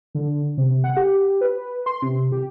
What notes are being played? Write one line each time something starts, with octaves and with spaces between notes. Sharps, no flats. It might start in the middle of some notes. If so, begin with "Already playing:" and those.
D3
C3
F#5
G4
B4
C6
C3
G4